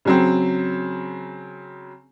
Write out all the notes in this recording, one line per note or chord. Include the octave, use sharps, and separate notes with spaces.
C#3 F#3 C4